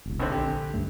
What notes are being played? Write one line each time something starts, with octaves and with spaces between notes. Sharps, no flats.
E1 C2
G#1 D3 C4
A#1 D3 G4
C#2 G2 A3